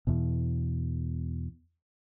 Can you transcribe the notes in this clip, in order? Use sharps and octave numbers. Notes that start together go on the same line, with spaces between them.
E2 B2